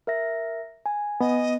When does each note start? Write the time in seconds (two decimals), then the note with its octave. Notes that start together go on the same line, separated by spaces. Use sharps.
0.07 A#4 E5 A#6
0.86 G#5
1.21 B3 D#5